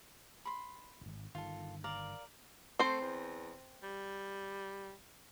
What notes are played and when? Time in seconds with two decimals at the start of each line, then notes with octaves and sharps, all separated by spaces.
0.45 B5 C6
1.01 D1 G#1
1.35 G1 D#3 F4 A4
1.84 A#4 D5 F5
2.79 A3 C4 C5
3.01 E2
3.83 G3